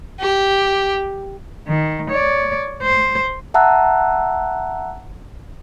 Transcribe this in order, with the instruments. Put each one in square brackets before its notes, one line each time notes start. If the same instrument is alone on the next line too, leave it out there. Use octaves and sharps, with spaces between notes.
[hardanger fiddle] G4
[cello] D#3
C#5 D5
C5
[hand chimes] E5 F#5 A5 A#5 E6 F#6